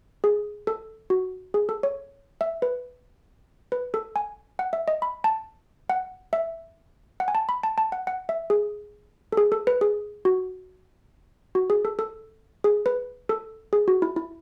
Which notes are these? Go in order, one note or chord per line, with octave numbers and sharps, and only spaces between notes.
G#4
A4
F#4
G#4
A4
C#5
E5
B4
B4
A4
G#5
F#5
E5
D#5
B5
A5
F#5
E5
F#5
G#5
A5
B5
A5
A5
F#5
F#5
E5
G#4
A4
G#4
A4
B4
G#4
F#4
F#4
G#4
A4
A4
G#4
B4
A4
G#4
F#4
E4
E4